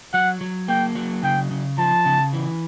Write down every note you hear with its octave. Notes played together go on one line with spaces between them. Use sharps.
F#3 F#5
F#3
A#3 G5
F#3
C#3 G5
C#3
F3 A5
C#3
E3